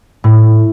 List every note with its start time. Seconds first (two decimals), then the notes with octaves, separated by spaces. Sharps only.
0.24 A2